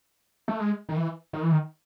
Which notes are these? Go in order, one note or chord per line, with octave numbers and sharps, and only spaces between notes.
A3
G#3
D#3
E3
D#3
E3
D#3